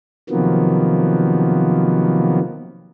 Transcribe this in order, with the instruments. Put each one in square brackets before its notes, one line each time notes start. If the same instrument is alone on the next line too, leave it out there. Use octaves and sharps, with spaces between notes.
[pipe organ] C3 D#3 F3 F#3 A#3 B3